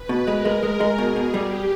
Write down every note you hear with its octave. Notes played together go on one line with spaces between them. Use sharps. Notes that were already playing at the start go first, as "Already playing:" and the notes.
Already playing: B4
B2
G#3 A#4
G#3
G#3
G#3
B2 G#4
B2
G3 G4